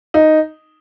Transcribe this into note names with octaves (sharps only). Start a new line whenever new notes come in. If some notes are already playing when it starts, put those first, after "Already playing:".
D#4